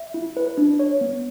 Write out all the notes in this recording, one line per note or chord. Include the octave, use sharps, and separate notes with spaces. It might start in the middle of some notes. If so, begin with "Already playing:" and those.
Already playing: E5
E4
B4
D4
C#5
B3